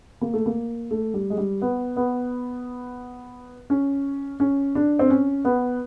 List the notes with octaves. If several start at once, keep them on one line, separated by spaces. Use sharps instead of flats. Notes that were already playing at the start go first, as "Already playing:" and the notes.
A#3
A3
A#3
A3
G3
G#3
G3
B3
B3
C#4
C#4
D4
C4
C#4
B3